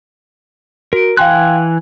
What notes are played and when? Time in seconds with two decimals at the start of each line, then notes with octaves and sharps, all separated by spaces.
0.93 F#4 A#4 D7
1.17 E3 F5 G5 G#5 C6 F#6